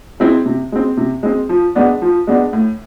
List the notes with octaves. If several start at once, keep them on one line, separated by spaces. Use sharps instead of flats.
G#3 C4 E4
C3
G#3 C4
C3
G#3 C4
F3
G#3 B3 D4
F3
G#3 B3 D4
A2